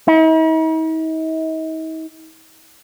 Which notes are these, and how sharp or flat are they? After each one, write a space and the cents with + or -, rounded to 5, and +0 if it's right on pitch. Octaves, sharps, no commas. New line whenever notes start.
D#4 +45